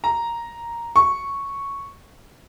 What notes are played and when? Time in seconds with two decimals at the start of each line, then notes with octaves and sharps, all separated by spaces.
0.04 A#5
0.96 C#6